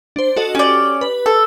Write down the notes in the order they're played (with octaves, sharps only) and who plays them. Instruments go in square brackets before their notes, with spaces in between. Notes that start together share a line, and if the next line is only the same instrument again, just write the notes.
[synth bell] D4 C5
F#4 A4 D#5
[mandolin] C#4 D5 [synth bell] G4
[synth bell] B4
[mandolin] A4